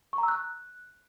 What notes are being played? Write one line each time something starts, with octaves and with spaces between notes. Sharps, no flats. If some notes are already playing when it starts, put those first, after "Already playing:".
C#6
A#5
E6
F#6